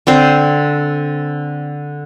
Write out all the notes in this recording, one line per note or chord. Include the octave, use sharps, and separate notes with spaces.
D3 C4 C5